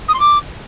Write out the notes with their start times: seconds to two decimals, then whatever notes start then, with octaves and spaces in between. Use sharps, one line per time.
0.08 D#6
0.14 C6
0.20 D6